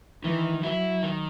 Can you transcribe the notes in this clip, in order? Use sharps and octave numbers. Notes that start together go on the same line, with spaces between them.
D#3 E3
F#3 E4
D#3